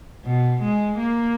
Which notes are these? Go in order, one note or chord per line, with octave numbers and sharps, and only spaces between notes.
B2
G#3
A#3